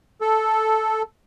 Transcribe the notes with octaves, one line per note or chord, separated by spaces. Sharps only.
A4